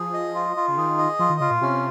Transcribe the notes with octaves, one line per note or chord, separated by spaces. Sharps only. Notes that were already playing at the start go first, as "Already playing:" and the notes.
Already playing: F3 G#4
D#5
F4
F4
C#3
D#3 G#4
D#5
F3 F4
D#3
C#3 F4
A#2
C3 C#4